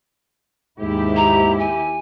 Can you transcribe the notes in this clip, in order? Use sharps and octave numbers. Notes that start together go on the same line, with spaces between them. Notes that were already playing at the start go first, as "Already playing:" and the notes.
D#2 G#2 E4 G4
A#5
G#5